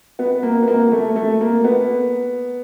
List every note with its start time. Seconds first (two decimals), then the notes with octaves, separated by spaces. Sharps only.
0.19 B3
0.43 A#3
0.62 B3
0.68 A#3
0.92 A3
1.16 A3
1.41 A#3
1.64 B3